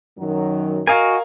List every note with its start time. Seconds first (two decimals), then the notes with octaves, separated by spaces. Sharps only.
0.18 F#2 D#3 F#3
0.87 F#4 A#4 D#5 F5 G#5